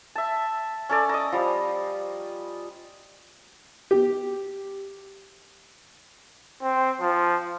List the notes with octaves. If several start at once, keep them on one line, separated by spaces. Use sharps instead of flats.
E5 A5
C#4 A4 D5
D#5 A#5
F3 G3
G4
C4
F3